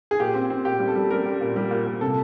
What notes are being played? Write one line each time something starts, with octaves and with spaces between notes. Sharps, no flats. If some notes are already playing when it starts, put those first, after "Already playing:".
G#4
A#2 G4
C4
C4
A#2 G4
G3
A4
G3
G3 A#4
G3
A#2
G3
A#2
A#2
C3 A4